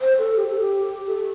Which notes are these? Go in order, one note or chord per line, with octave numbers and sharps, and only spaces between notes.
C5
A4
G4
A4
G4
A4